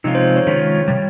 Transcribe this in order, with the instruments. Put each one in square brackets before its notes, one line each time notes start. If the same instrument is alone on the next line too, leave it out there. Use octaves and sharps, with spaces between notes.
[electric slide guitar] C3 F3 G#3 C#4 F4 [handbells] D#4
[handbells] C5
C#5
[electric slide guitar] D#3 G#3 C#4 F4
C3 G3